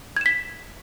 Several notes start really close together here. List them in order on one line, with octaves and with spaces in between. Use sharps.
G#6 E7 B6